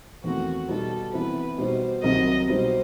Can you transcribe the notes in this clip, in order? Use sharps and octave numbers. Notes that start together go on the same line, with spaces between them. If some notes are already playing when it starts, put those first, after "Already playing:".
E2 D#3 A3 C4 F#4
B2 G3 D#4 A4
C3 E3 B3 E4 B4
B2 G3 D#4 C5
C2 C3 D#3 F#3 C4 D#5
B2 G3 D#4 C5